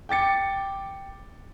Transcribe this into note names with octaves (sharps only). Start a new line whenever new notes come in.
G5 D6 A6 C#7